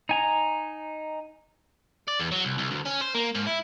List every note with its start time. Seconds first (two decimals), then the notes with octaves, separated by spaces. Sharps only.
0.09 D#4 G#5 A#5
2.08 D5
2.19 E2
2.32 F#3
2.45 C2
2.58 C2
2.71 D2
2.85 C#4
3.01 C5
3.15 A#3
3.35 G#2
3.46 E4